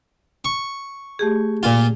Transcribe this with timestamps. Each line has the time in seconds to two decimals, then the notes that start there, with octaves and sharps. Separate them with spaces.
0.45 C#6
1.19 A3 G4 G#4
1.63 A#2 F4